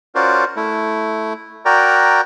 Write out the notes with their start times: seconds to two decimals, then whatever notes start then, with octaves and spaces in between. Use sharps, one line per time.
0.15 C#4 F4 F#4 A#4 C5 D5
0.56 A3 E4
1.65 F#4 A#4 D5 G5 A#5